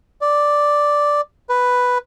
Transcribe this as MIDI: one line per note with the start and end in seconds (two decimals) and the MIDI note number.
0.21 1.21 74
1.49 1.98 71